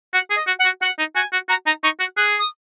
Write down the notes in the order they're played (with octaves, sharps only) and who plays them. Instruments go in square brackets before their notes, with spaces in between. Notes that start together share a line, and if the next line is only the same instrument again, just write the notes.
[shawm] F#4 [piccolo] F#5
[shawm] G#4
[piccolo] D#5
[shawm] F#4
[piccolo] F#5
[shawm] F#4
[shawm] F#4 [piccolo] F#5
[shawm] D#4
[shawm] F#4 [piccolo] G#5
[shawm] F#4
[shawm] F#4 [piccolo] A#5
[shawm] D#4 [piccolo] A#5
[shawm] D#4 [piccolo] C#6
[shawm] F#4 [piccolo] F#6
[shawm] G#4 [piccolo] F#6
[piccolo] D#6